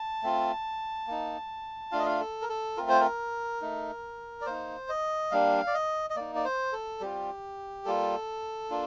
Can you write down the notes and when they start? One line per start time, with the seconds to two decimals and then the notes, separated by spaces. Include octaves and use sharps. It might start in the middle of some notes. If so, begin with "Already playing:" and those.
Already playing: A5
0.23 A3 C4 F4
1.07 A#3 D#4
1.92 A3 D4 F4 F5
1.99 D#5
2.06 F5
2.20 A4
2.42 A#4
2.49 A4
2.77 A3 C4 F4 A#4
2.89 C5
3.00 A#4
3.62 A3 D#4
4.41 D5
4.46 A#3 D#4 C5
4.89 D#5
5.31 G3 A#3 D4 F5
5.67 D5
5.74 D#5
6.10 D#5
6.16 A#3 D#4 D5
6.35 D5
6.44 C5
6.72 A4
7.01 G3 C4 F4 G4
7.85 G3 A#3 F4 A4
8.70 A#3 D4 F4